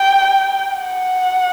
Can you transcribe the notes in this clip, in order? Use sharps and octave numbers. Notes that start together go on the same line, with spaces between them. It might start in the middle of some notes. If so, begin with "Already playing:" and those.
Already playing: G5
F#5